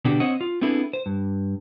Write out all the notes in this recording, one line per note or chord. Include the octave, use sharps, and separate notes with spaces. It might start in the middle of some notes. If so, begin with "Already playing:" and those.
B2 D3 B3 D4 F#4 G4
C4 C5 C#5 D#5 F#5
F4
B3 C4 D4 E4 G#4 A4
C5
G2